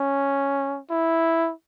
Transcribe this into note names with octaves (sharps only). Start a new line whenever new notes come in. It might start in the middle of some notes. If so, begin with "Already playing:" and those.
Already playing: C#4
E4